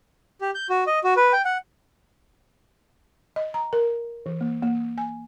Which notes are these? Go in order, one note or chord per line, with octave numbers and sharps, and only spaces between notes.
G4
G6
F#4
D#5
F#4
B4
G5
F#5
D#5
A#5
A#4
E3
A#3
A#3
G#5